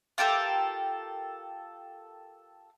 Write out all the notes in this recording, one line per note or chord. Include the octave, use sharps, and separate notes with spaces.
F4 G4 A4 A#4